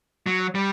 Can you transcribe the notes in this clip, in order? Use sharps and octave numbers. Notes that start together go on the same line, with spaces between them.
F#3
G3